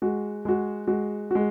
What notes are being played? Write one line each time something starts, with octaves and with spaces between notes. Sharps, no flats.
G#3 F#4
G#3 F#4
G#3 F#4
G#3 F#4